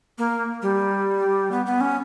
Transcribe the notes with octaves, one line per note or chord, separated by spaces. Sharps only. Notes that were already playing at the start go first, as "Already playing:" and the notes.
A#3
G3
B3
B3
C#4